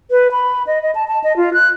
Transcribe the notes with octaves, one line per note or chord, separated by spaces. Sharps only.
B4
B5
D#5
D#5
A5
A5
D#5
F4
F#6